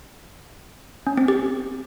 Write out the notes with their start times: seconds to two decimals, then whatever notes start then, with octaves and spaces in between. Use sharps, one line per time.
1.07 C#4
1.17 C4
1.28 G4